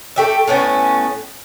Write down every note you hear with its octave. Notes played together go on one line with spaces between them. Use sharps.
A3 G4 E5
A2 A3 B3 C#4